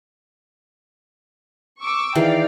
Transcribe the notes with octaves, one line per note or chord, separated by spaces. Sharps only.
C#6 D6 E6
D#3 E3 G#4 D5 F5 G5